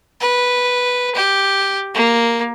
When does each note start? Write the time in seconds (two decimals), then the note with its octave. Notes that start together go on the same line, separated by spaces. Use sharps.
0.20 B4
1.15 G4
1.94 A#3